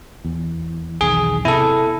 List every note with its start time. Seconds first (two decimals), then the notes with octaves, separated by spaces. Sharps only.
0.24 E2
1.01 B1 E2 D#3 G#4
1.45 C3 B3 E4 A4